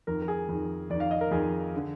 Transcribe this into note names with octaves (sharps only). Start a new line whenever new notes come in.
F2 D#3 A#4
A#4
G#4
F2 D#3
F2 D#3 D5
F5
D#5
A#4
F2 D#3 G#4
D3